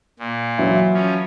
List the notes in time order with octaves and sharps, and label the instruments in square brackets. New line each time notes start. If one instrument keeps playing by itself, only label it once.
[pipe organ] A#2
[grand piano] E3 F#3 E4
[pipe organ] F3 C#4